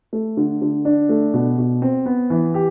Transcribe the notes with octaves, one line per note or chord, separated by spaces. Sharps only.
A3
D3
D3
D4
A3
B2
B2
C4
B3
E3
G4